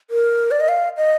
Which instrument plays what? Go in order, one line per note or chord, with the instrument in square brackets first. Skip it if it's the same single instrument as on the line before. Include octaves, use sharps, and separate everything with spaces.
[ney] A#4
D5
D#5
F5
D#5